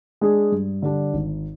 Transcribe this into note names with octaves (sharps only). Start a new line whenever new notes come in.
G#3 D4 G#4
G2
D3 G3 D4
G#1